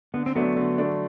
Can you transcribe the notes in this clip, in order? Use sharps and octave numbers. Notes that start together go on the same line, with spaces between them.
D3 B3
C4
F#3 A3 B3 D4
D3
F#3 A3 D4